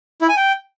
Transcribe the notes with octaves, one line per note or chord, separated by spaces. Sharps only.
E4
G#5
G5